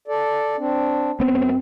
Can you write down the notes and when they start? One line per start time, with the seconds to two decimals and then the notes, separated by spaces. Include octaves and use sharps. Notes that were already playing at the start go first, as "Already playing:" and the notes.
0.08 A4 D5
0.58 C4 D4
1.20 F#2 B3 C4